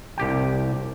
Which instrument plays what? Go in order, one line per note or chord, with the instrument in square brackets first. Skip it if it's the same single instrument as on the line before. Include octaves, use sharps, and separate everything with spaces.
[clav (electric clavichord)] C2 G4 G5